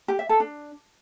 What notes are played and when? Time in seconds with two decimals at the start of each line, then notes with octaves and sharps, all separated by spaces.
0.08 G4
0.19 E5
0.29 A4
0.40 D4